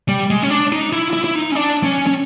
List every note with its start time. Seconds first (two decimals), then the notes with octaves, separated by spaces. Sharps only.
0.09 G3
0.30 G#3
0.43 C#4
0.51 D4
0.72 D#4
0.93 E4
1.13 E4
1.24 E4
1.35 D#4
1.52 C#4
1.55 D4
1.84 C#4
2.07 C#4